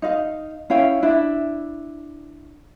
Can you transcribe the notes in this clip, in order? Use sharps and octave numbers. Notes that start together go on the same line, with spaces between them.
D#4 D#5 F5
C#4 E4 F5 G5
D4 E4 E5